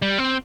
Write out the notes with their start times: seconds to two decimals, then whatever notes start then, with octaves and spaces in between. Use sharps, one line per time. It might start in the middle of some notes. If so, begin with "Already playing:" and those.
0.02 G3
0.18 C4